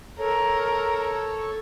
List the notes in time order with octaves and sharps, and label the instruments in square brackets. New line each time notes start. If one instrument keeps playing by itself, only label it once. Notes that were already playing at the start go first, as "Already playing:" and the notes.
[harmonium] A4 C#5 [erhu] A#4